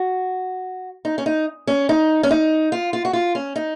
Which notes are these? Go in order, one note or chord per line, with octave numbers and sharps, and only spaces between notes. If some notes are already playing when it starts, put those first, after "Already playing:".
Already playing: F#4
D#4
C#4
D#4
C#4
D#4
C#4
D#4
F4
F4
F#4
F4
C#4
D#4